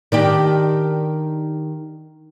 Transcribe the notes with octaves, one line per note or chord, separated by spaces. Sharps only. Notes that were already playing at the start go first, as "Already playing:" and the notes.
D#3 D4 G4